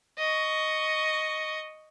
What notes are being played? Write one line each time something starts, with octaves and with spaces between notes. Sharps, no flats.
D#5 C#6